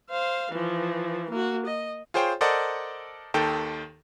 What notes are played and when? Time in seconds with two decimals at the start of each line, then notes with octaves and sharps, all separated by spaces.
0.10 C5 F5
0.52 E3 F3
1.31 A#3 F#4
1.66 D#5
2.14 F4 G#4 C5 C#5 G5
2.41 A4 A#4 C5 D5 D#5 F#5
3.34 D#2 D#3 A4 G5